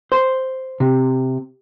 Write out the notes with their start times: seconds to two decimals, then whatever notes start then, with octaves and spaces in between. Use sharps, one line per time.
0.12 C5
0.80 C3